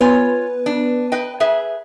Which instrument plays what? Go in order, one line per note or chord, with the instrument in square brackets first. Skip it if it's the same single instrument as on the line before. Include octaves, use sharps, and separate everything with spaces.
[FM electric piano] B3 B4 [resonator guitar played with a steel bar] F4 C#5 G#5
[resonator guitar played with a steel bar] D4
B4 D#5 G5
G#4 B4 E5